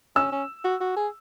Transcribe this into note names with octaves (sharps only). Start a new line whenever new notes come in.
C#4 E6
C#4
F#4
F#4
G#4